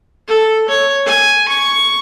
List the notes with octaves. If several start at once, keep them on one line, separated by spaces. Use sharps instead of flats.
A4
C#5
G#5
C#6